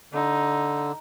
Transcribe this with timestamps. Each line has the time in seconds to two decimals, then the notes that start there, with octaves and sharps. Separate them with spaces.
0.13 D3 D#4